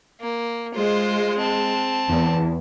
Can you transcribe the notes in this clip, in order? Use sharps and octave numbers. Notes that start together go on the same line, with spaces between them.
A#3
G#3 F4 C5
C4 A5
E2